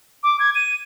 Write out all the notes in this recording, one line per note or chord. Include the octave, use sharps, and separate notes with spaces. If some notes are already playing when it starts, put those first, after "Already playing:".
D6
G#6
D#7